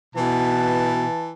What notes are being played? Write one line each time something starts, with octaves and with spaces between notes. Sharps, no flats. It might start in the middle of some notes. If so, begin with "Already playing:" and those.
B2 E3 A5